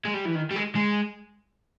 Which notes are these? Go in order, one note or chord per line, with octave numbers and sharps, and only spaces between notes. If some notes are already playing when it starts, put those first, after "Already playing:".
G#3
G3
E3
D#3
G3
G#3
G#3